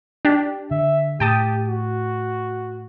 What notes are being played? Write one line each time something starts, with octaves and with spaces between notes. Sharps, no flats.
D4 G4
D3 E5
A2 G4 G5 A5 D#6
F#4